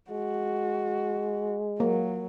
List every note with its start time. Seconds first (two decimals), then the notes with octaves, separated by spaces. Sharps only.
0.11 G#3 F#4
1.80 F#3 A#3